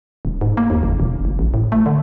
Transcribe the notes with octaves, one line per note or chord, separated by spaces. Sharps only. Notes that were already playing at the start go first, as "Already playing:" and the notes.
D#1
G#2
A#3
D#2
F#1
E1
F#1
A1
A2
A3
D3